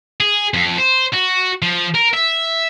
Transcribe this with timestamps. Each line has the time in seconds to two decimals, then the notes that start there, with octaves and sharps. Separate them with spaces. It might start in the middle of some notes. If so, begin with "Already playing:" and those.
0.20 G#4
0.54 F2
0.78 C5
1.13 F#4
1.62 F3
1.94 A#4
2.13 E5